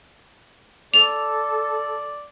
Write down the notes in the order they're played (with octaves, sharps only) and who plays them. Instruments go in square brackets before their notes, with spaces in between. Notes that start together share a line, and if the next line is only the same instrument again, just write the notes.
[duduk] A4 [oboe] D5 [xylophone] F7